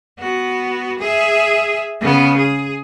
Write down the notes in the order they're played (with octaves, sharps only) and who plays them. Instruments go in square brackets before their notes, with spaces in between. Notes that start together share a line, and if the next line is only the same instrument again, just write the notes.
[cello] B3 F#4
G#4 E5
C#3 B3
G#4